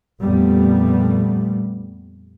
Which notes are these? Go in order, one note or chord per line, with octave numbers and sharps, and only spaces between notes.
F2 A#2 G3 A3 B3